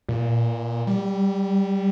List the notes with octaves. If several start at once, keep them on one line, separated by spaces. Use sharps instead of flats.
A#2
G3